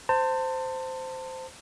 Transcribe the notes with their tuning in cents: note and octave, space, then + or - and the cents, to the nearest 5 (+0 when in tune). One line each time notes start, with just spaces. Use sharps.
C5 -10 A5 +30